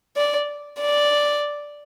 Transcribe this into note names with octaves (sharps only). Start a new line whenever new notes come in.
D5
D5